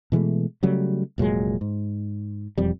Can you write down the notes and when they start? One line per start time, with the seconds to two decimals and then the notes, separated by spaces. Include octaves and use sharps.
0.12 B2 E3 G#3 A3
0.63 C#3 F#3 G3 A3
1.18 F1 A#2 F#3 G#3
1.61 G#2
2.58 E1 F2 G3